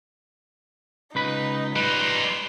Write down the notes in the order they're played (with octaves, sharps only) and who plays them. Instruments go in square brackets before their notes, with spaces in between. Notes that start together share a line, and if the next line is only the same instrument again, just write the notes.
[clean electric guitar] C#2 B4 B5 [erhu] D#4
[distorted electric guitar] G3 D#4 [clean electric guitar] B4 [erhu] C6